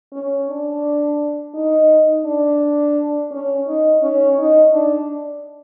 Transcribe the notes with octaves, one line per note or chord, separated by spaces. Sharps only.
C#4
D4
D#4
D4
C#4
D#4
C#4
D#4
D4